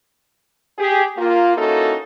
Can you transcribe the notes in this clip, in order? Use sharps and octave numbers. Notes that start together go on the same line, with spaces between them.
G4 G#4
A#3 F4
A#3 C#4 D#4 E4 F#4 A4